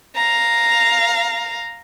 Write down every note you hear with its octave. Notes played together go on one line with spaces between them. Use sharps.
F5 A#5